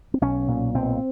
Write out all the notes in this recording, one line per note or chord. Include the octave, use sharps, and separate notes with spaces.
C4
B1 C#4
A#2
B1 C4